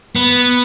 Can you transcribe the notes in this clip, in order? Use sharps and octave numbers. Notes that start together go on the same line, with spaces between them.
B3